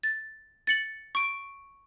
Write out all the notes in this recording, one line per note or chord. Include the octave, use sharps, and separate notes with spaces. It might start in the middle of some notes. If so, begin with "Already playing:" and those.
A6
A6 C#7 F#7
C#6 D7